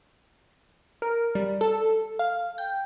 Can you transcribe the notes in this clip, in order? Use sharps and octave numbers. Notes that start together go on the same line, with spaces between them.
A#4
G3
A4
F5
G5